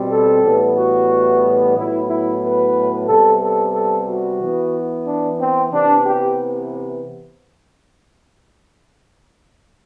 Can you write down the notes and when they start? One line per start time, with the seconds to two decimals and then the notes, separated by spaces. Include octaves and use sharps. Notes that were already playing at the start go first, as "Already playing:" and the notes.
Already playing: B2 G3 C4
0.11 A4
0.44 A2 E3 G3 B3
0.76 F#4
1.76 A2 F#3 B3 E4
2.09 E4
2.42 B4
3.08 C3 G3 B3 A4
3.42 A4
3.75 A4
4.07 F#4
4.40 E3 B3
5.07 D4
5.39 C4
5.72 C3 E3 B3 D4
6.05 G4